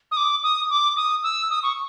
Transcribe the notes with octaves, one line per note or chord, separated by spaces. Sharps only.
D#6
D6
D#6
D6
D#6
E6
D#6
C#6